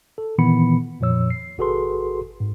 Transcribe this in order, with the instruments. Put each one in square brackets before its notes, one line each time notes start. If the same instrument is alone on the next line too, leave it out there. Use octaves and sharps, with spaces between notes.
[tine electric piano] A4
A#2 D#3 E3 B3 B5 C#7
F2 A#2 F3 C#5 E6
C7
G1 F#4 G#4 A4 B4 C6
G#2